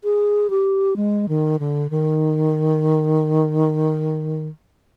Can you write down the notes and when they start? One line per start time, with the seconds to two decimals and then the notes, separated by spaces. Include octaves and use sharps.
0.04 G#4
0.50 G4
0.96 G#3
1.29 D#3
1.59 D3
1.90 D#3